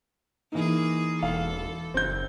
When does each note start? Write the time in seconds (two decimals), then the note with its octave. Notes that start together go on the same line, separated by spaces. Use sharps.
0.52 E3 A#3 D#4 G#4
1.23 E1 A4 F5
1.94 F#1 C4 G6